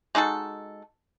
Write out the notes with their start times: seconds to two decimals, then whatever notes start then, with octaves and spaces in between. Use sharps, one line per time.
0.15 G#3 D#4 F#4 A4